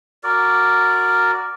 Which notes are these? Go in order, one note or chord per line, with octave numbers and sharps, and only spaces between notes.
F#4 A#4 D5